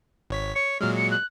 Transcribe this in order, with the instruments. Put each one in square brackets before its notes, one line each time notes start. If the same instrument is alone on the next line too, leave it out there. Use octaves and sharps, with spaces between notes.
[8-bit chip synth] G#1 C#5 B6
[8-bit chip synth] C#5 [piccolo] C#7
[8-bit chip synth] A#2 F#3 G#3 [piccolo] F6
[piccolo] C#7
F#6